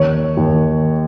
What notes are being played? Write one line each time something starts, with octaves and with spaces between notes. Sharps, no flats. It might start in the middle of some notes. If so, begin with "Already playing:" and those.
Already playing: D#2 C#5
D#2